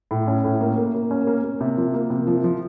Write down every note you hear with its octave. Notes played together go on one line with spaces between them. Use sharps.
A2
C#4
A2
A#3
A#3
A#3
C#4
A#3
A#3
C3
F3
A#3
C3
F3
F3